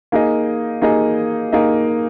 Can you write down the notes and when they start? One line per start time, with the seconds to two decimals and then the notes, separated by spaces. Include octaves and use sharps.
0.12 A#3 D#4 G#4 D#5
0.82 A#3 D#4 G#4 D#5
1.53 A#3 D#4 G#4 D#5